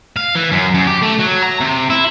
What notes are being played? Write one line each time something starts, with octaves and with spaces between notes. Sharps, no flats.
F5
E3
F#2
F#2
G4
A3
F#3
A#5
C3
E4